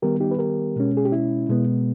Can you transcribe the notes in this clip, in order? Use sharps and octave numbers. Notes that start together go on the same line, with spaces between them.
D#3 G3 B3 G4 A#4
D#4 G4
B4
G4 A#4
B2 G#3 C#4
G#4
G4
E4
B2 G#3 B3